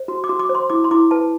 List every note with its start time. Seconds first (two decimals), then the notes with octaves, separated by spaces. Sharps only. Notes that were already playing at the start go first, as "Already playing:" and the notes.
Already playing: C5
0.08 F#4
0.24 D6
0.29 F#4
0.39 D6
0.49 C5
0.55 C6
0.70 E4 D6
0.84 C6
0.91 E4 D6
1.11 B4 A5